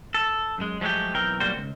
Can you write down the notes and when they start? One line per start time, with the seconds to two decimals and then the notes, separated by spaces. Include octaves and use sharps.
0.14 A4
0.58 F#2 G#3
0.81 F3 F#3 G#3 A3 G4
1.15 B1 E3 C4 A#4 G5
1.40 B1 G3 A#3 F#4 C5
1.56 C#2